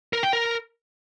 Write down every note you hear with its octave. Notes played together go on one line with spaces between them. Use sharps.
A#4
G5
A#4